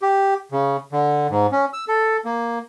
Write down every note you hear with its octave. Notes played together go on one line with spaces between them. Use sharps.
G4
C#3
D3
G#2
C#4
E6
A4
A#3